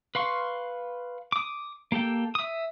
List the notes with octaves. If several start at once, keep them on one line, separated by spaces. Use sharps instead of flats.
B4 F5 C6 C#6
D6 D#6
A#3 G4 A4 G5
E5 D#6